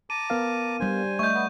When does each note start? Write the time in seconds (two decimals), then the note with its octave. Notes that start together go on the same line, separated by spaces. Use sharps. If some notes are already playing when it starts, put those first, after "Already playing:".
0.10 A5 A#5 D6 D#7
0.30 B3 A#4 F5
0.80 G3 D4 C5 G#5
1.19 A3 D#5 E5 C#6 G6
1.34 B3